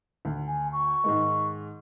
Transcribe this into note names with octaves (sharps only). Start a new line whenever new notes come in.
D2
G#5
C#6
G#2 D#3 G#3